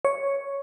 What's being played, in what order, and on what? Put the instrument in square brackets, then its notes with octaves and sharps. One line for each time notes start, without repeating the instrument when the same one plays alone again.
[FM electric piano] C#5